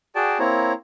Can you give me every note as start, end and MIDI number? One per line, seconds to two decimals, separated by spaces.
0.15 0.38 66
0.15 0.38 68
0.15 0.38 74
0.15 0.38 79
0.15 0.38 81
0.39 0.73 58
0.39 0.73 60
0.39 0.73 64
0.39 0.73 73
0.39 0.73 82